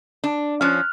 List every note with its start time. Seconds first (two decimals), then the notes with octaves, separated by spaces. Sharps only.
0.24 D4
0.61 F3 C#4 F6 F#6